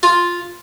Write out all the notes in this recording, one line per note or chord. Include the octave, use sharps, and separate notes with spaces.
F4